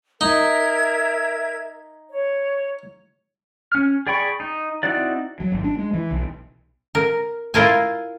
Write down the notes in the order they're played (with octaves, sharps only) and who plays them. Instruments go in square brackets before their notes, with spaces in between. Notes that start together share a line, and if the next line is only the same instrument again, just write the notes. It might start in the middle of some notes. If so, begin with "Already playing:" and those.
[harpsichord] D#4 [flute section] A#4 E5 G#6
[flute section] C#5
[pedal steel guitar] C#4 F6
G#4 D5 G5 B5 C#6
D#4
C4 D#4 E4 F#4 D5
[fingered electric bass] F#3
G#1
D4
G#3
E3
B1
[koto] A#4
E4 F4 A#4 G#5